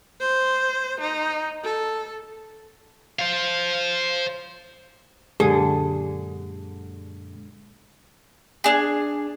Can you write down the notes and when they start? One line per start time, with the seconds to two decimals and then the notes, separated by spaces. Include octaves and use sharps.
0.20 C5
1.00 D#4
1.64 A4
3.19 C5 F5
5.40 F#2 A#2 D3 G#3 G4 G#4
8.64 D4 G#4